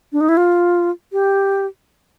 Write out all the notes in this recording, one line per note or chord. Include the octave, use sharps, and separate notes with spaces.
D4
D#4
E4
F4
G4